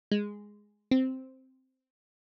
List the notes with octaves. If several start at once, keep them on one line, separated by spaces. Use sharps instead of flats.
G#3
C4